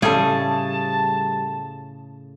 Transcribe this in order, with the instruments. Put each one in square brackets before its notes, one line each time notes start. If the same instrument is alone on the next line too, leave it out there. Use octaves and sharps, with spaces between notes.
[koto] A2 C#3 G#4 [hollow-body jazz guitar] G3 A4 [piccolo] A5